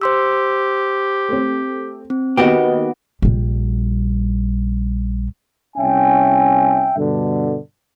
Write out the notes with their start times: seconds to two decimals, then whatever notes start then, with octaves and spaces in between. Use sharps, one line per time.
0.01 G4 C5 C6 E6
1.29 A3 C4
2.10 C4
2.37 D#3 A#3 B3 F#4 G4 B4 D#5
3.22 A#1 G3
5.76 C2 C#4 E5 G5 G#5
6.96 G2 B2 D3